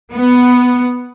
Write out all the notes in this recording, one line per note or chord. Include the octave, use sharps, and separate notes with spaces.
B3